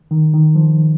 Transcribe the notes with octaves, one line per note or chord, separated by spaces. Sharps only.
D#3
D#3
F3